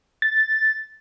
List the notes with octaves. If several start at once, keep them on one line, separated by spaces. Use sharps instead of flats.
A6